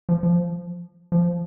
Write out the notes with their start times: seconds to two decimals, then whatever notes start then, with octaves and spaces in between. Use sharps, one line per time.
0.09 F3
0.23 F3
1.12 F3